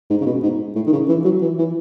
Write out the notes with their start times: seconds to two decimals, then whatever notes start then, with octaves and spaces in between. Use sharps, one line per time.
0.10 G#2
0.21 C#3
0.26 B2
0.43 G#2
0.76 A2
0.87 D#3
0.93 C#3
1.09 E3
1.25 F#3
1.42 E3
1.58 E3